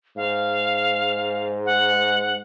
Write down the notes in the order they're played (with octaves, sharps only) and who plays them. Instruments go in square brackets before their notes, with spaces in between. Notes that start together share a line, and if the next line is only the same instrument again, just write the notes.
[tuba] G#2 [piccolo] F5
[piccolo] F#5